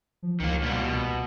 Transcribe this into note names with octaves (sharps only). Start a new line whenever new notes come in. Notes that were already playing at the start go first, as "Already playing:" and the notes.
F3
C#2 D#3 A#3
B2 G3 A#3
B2